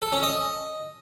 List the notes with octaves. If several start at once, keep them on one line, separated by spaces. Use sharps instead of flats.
A4
C#4
D#5